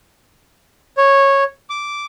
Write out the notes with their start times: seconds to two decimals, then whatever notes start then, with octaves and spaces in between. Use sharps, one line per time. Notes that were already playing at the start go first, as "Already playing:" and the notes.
0.97 C#5
1.70 D6